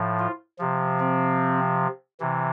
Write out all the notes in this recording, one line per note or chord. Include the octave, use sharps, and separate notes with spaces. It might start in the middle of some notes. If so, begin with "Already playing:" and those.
Already playing: A2 F3
F4
C3 F3
C4
C3 E3